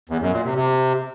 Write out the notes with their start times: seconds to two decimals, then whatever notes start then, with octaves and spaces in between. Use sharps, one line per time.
0.09 E2
0.21 F#2
0.33 A#2
0.44 C3
0.56 C3